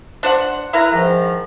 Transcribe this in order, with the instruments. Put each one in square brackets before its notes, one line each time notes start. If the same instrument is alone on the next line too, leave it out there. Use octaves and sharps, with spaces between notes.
[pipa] D4 C5 F#5
[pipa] E4 [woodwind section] A#4 B4 A#5
[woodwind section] G#2 D#3 F3